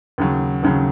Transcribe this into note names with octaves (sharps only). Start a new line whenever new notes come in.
D#2 C#3 F#3
D#2 C#3 F#3